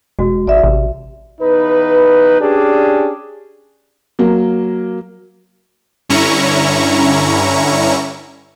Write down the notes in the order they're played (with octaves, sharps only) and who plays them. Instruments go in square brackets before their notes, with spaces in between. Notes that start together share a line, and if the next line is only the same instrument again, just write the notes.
[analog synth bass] E1 [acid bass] G#3 [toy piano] F#4
[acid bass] G#1 [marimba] D5 E5
[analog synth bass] A1 [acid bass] C3
[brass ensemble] E2 D#4 B4
C#4 D4 G4 G#4 D5
[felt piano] F#3 A#3
[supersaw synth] G2 D3 C#4 E4 A#5 C#6